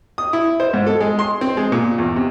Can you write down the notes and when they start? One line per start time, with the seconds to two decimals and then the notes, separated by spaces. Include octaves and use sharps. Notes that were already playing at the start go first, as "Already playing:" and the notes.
0.18 D#6
0.33 E4
0.60 C5
0.74 G#2
0.87 A4
1.00 G#3
1.19 C6
1.41 C4
1.57 G#3
1.72 A#2
1.98 E2
2.16 C3